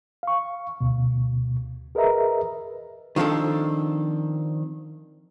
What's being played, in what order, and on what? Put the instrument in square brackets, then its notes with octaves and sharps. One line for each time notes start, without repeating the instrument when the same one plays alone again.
[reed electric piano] F5 C#6
D2 B2
G#4 A#4 B4 D#5 E5 A#5
[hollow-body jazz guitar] D#3 F3 C4 D4 A4